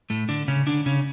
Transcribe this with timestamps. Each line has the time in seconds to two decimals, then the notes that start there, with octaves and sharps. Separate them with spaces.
0.10 A2 A3
0.29 D3 D4
0.48 C#3 C#4
0.67 D3 D4
0.86 C#3 C#4